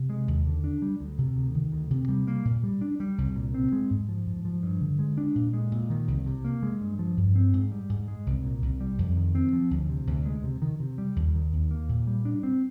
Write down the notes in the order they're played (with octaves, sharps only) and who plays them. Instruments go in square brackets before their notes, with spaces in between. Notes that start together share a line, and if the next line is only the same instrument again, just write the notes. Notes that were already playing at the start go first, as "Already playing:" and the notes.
Already playing: [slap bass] C3
G#3
D#2
D3
D4
G3
D2
C3
D2
D#3
D2
C3
G3
A#3
A#2
G3
D4
G3
C2
A#2
C4
G#3
G#2
F3
G#2
F3
G2
D3
G#3
D4
A#2
G#3
A#2
D#3
C2
C3
A#3
G#3
G2
F3
G2
C4
G#2
G3
G#2
G#3
C2
A#2
C2
G3
F2
D#3
C4
F3
D2
C3
D2
G#3
C3
D#3
C3
G3
D#2
D#3
D#2
A#3
A#2
G3
D4
C4